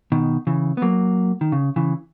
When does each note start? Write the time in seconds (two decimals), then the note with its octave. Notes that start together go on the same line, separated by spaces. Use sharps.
0.12 B2 D#3
0.47 C#3 E3
0.77 B3
0.82 F#3 A#3
1.41 D#3
1.52 C#3
1.76 C#3 E3